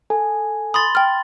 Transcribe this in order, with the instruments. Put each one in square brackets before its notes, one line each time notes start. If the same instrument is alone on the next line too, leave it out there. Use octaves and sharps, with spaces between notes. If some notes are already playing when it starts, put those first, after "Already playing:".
[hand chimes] A4 G#5
[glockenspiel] B5 C6 A6 [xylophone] D#6
[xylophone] G5 F6